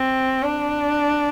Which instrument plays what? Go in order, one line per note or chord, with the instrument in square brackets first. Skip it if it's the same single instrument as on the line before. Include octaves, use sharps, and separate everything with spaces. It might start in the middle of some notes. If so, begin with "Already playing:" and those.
Already playing: [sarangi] C4
D4